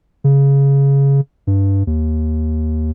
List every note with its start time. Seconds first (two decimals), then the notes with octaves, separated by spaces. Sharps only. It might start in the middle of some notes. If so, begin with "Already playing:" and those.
0.24 C#3
1.47 G2
1.87 D#2